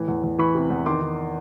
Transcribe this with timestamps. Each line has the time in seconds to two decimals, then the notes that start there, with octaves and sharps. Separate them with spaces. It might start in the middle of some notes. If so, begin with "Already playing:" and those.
Already playing: A2 E3
0.08 E2
0.24 E2
0.39 E3 B5 C#6
0.55 C3
0.70 E2
0.86 D#3 C6 D6
1.02 D#3